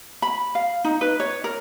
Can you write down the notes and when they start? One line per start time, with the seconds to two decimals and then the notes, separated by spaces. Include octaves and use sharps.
0.22 B5
0.55 F5
0.84 D#4
1.01 B4
1.20 C#5
1.44 A#4